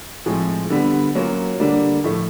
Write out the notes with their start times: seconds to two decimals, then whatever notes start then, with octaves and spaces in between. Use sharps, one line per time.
0.26 A2 F3 G#3 C4
0.70 D3 G3 B3
1.15 F#3 A#3 C#4 F4
1.60 D3 G3 A#3 D4
2.04 A2 F3 A3